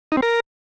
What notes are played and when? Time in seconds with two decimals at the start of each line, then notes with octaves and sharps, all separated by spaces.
0.12 D#4
0.17 C4
0.22 A#4